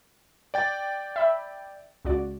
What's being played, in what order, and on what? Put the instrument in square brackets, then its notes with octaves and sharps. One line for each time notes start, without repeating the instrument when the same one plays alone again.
[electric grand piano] D5 G5 A6
[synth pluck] E5 B5
C#2 F#4 D5